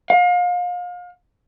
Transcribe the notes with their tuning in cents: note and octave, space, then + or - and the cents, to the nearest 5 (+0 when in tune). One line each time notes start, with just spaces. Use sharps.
F5 +35